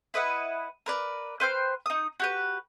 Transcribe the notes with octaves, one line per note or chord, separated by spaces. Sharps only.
E4 B4 D#5 F#5
A#4 B4 D5
B4 C5 G5 F6
D#4 D#6
F#4 G4 B4